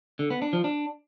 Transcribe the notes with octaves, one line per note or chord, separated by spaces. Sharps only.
D3
B3
D4
F3
D4